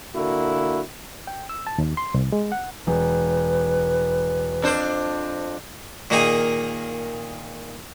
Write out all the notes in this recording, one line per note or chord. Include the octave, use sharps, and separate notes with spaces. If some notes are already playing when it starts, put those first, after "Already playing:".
D3 A#3 E4 F#4
G5
E6
A5
D#2
C6
C2
G#3
F#5
E1 B4
F2 D4 C5
A#2 D#3 A#3 D#4 G#4